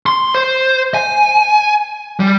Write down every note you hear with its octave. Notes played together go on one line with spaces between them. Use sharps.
C6
C5
G#5
G3